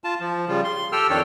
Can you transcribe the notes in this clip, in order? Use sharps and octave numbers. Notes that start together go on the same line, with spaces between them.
F4 A5
F3
C#3 G3 F4
C6
G4 A4 G5 E6 F6
F2 D#3 D4 A4 C#5 G5